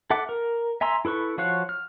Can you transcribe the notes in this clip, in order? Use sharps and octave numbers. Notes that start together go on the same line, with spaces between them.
A4 E5 F#5 D6
A#4
E5 G#5 A#5 C6 E6
E4 A4 B4 C#6
F3 F#4 C#5 F5 F#6
F6